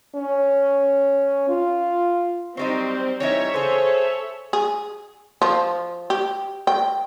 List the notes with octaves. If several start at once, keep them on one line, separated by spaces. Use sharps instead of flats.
C#4
F4
F#3 G3 C4 D#4 C5
E3 G3 D#4 C#5 E5
C#3 G#4 A4 C5
G#4
F3
G4
G5